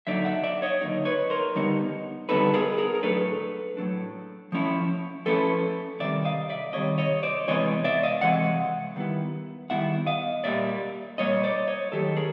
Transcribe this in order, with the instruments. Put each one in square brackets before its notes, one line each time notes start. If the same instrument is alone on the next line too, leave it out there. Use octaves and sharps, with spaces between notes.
[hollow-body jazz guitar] D3 F#3 A#3 D#4 D5 E5
E5 F#5
D5 E5
C#5 D#5
D3 F#3 A#3 D#4
B4 C#5
A#4 C5
D3 G3 B3 D#4
D3 G3 B3 D#4 A4 B4
G#4 A#4
G#4 A#4
A#4
A2 F#3 A3 D4 A4 B4
A2 F#3 A3 D4
F3 A3 C#4 E4
F3 A3 C#4 E4 A4 B4
C3 D#3 G3 D5 E5
D#5 F5
D5 E5
C3 D#3 G3 C#5 D#5
C#5 D#5
C5 D5
C3 E3 G#3 B3 C#5 D#5
D5 E5
D#5 F5
C3 E3 G#3 F#5
D#3 G3 B3 E4
D#3 G3 B3 E4 E5 F#5
D#5 F5
A#2 G3 A#3 D5 E5
A#2 G3 A#3 C#5 D#5
C5 D5
C#5 D#5
D#3 F#3 A3 G4 A4
G#4 A#4